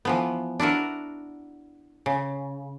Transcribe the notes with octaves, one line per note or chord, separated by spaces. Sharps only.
E3 F3 B3
D4 E4 F#4 A#4
C#3